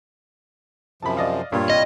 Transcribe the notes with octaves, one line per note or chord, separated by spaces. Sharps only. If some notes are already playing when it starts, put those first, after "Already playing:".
F#2 C3 F3 A5 B5
D5 D#5 F5
G2 A#2 G3 F4 C#5
C2 D#5